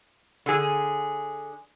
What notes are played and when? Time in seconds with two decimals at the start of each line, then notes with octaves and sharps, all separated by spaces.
0.46 D3 G#4